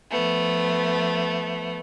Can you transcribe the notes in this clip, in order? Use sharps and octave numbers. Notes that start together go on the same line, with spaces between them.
F3 A3 B3